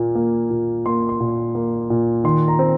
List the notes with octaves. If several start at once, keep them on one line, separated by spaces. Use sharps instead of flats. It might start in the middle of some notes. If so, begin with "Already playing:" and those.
Already playing: A#2 A#3
A#3
A#2
A#3 C6
C6
A#2
A#3
A#2
D#3 C6
A#5
C4